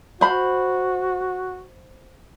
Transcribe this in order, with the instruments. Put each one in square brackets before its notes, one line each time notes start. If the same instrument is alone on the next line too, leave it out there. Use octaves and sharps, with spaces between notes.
[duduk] F#4 [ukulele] C5 B5